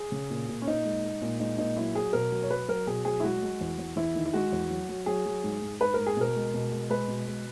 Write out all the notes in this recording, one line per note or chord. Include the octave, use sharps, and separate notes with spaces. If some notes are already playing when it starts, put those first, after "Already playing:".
Already playing: G#4
C#3
A#2
A#2
C#4
A#2 D#4
G#3
G#3
A#2
G#3 D#4
A#2 D#4
F#3 E4
F#3 G#4
B2 A#4
F#3
C#5
F#3 B4
F#3 A#4
B2 G#4
F#3 G#4
E4
G#3 F#4
G#3
E2
E2
E2 E4
D#3
E4
G#3 F#4
E2
F#3
F#3
F#3 G#4
F#3
G#2
G#2
G#2 B4
G#2 A#4
G#4
B2 A#4
G#3
B2
G#3
G#3 B4
B2
G#3